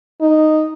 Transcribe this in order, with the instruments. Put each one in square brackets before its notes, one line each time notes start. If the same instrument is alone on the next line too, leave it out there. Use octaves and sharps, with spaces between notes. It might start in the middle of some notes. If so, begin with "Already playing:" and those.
[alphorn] D#4